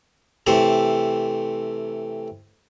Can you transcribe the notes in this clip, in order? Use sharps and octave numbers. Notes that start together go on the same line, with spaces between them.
C3 E3 A3 G4 C5